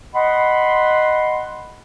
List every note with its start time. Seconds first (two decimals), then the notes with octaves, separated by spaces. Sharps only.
0.15 D#5 F#5 B5 C6